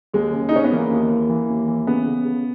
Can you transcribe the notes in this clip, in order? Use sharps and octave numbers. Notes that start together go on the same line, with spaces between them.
D#2 G#3
C#3
D#4
C#3 C#4
B3
E3 A#3
D#2
E3
E3
D#2
E3
C#3 B3
C#3
C#3